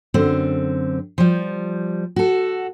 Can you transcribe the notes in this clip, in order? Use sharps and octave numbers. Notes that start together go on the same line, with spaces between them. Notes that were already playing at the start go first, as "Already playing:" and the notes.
F#2 D3 C4
F3 G3
F#4 A4